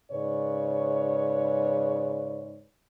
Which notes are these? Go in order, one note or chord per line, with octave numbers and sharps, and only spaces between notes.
G#2 C#3 B4 C#5 D5